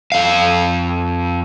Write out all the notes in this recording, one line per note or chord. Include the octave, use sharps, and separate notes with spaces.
F2 F5